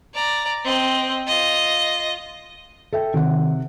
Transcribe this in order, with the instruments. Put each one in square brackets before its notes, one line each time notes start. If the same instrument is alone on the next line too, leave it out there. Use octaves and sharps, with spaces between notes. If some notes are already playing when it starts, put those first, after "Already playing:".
[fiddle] D5 A#5
C4 D#5
F4 D#5
[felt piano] A4 E5 G5
[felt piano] C3 F#5 [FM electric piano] D#3